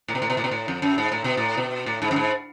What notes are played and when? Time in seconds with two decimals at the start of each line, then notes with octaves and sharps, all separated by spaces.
0.08 A2
0.15 B2
0.22 A2
0.30 B2
0.37 A2
0.44 B2
0.51 A2
0.68 F2
0.82 F#2
0.98 G#2
1.12 A2
1.24 B2
1.37 A2
1.57 B2
1.86 A2
2.02 G#2
2.11 F#2
2.16 G#2